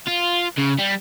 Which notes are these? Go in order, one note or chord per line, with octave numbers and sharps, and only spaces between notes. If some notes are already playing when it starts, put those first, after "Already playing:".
F4
C#3
G3